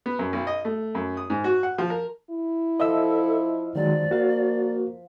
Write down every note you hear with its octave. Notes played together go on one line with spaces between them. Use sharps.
B3
F#2
B1
D#5
A3
F#2
D#6
G#2
F#4
F#5
F3
A#4
E4
F3 A4 D#5 E5 E6
D#3 F#3 G#3 D5
A#3 F#4 F5